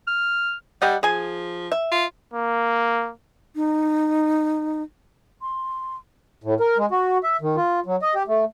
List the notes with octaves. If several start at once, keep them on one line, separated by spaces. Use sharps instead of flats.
F6
G3 G4 D#5 F#5
F3 G#4 G#5
E5
F4
A#3
D#4
C6
A2
A#4
G#3
F#4
E5
D#3
F4
F#3
D#5
G4
A3